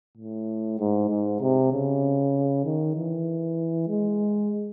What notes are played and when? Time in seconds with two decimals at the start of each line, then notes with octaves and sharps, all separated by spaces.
0.17 A2
0.79 G#2
1.10 G#2
1.41 C3
1.72 C#3
2.65 D#3
2.95 E3
3.88 G#3